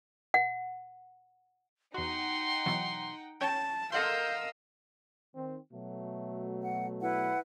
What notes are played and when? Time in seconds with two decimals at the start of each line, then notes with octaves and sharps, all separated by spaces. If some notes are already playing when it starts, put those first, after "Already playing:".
0.34 F#5
1.94 E2 D#4 F#4 F#5 G5 C6
2.66 B2 E3 F#3
3.41 C#4 C#5 G5 A5
3.92 A4 A#4 D#5 F5 F#5 C6 E6 G6
5.35 D#3 C4
5.73 B2 F#3 A3
6.63 F#5
7.01 E4 B4 F#5